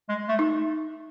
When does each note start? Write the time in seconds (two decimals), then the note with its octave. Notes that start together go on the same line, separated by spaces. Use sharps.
0.09 G#3
0.28 A3
0.39 D#4